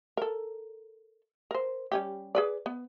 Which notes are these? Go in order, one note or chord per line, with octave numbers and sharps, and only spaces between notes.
A4 A#4
A#4 C5
G3 C#4 G4
G#4 B4 D5
B3